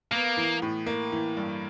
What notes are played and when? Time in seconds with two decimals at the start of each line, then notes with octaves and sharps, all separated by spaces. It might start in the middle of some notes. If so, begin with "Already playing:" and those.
0.12 A#3 B3
0.37 E3
0.62 A2
0.86 A#3
1.12 E3
1.37 G2